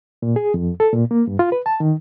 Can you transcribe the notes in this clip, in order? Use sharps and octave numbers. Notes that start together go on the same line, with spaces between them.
A#2
G#4
F2
A4
A#2
A#3
G2
F4
B4
A5
D#3